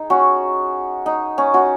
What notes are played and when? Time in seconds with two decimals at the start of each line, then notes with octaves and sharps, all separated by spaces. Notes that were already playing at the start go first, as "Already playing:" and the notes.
Already playing: D#4 G#4
0.10 C#4 F#4
1.06 D#4
1.38 C#4
1.54 C#4 F#4